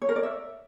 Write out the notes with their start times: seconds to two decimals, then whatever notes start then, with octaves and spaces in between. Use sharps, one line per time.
0.02 C#5
0.09 A#4
0.16 D5
0.23 E5